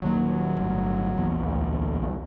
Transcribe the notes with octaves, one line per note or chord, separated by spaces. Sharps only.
D#1 D#2 F#3 A#3
G1 A2
A#1 E2 A#2
D2
C2